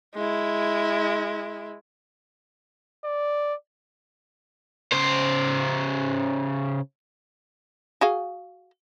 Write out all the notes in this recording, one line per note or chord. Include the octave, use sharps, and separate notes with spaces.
G#3 E4
D5
C#3 C5
F#4 G#4 F5